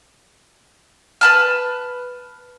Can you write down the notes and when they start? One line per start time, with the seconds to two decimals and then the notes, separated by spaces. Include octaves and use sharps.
1.21 B4 A5 F6